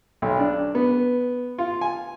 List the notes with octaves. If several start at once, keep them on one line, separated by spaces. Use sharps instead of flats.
B1
D4
B3
F4
G#5